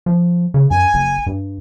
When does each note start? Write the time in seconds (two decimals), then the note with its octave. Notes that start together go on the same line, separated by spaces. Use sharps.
0.06 F3
0.54 C#3
0.71 F#2 G#5
0.94 F#1
1.26 G2